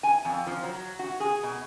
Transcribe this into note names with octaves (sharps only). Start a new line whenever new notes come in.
G#5
F2
F3
F#3
F#4
G#4
B2